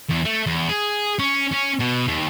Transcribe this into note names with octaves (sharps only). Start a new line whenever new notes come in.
E2
A3
E2
G#4
C#4
C#4
B2
D#2